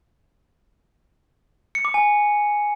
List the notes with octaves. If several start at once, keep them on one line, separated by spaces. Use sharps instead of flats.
C#7
D6
G#5